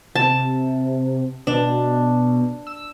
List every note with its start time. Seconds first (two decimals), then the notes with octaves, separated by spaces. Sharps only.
0.15 C3 A5
1.47 B2 D4
2.67 E6